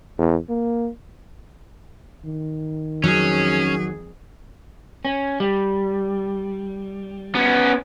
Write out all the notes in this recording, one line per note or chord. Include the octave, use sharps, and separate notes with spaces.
E2
A#3
D#3
F2 F#3 C#4 G#4
C#4
G3
B3 C#4